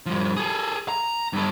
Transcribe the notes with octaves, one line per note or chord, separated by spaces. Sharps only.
G2 F3
G#4 A4
A#5
G2 A4